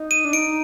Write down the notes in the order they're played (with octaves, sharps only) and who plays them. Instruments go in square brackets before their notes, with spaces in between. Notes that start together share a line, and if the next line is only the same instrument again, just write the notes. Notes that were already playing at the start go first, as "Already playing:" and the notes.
Already playing: [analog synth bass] D#4
[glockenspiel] D#7
[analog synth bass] D4
[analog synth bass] D#4 [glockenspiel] D7